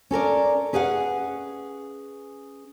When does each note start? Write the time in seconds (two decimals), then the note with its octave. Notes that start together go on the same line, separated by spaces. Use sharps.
0.11 C#4 A4 A#4 D5
0.73 C#4 G#4 B4 F5 F#5